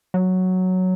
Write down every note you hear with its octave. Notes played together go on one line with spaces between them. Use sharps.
F#3